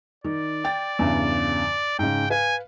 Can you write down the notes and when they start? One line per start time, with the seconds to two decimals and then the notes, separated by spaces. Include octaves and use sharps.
0.24 D#3 D5
0.64 G5 A6
0.99 E2 G2 C#3
1.99 G#2 C#3 G5
2.30 B4 F5 G#5